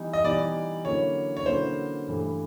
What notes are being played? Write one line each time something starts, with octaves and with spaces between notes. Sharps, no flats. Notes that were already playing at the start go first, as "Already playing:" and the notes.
Already playing: E3 G3 B3 D#4
D#5
E3 G3 B3 D#4 D5
D3 F#3 A#3 C#4 E4 C#5
C#5
D3 F#3 A#3 C#4 E4 C5
G2 E3 A3